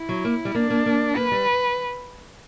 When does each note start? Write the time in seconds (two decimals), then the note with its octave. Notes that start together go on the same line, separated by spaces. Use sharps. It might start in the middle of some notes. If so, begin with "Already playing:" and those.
Already playing: E4
0.09 F#3
0.25 A#3
0.45 G3
0.55 A#3 D4
0.70 A#3
0.86 A#3
1.16 A#3 B4
1.32 G3